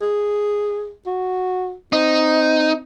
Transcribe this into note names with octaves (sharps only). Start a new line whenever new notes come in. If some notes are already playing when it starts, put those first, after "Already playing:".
G#4
F#4
C4 D#4